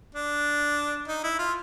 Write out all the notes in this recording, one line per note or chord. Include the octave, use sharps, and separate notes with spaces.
D4
D#4
E4
F4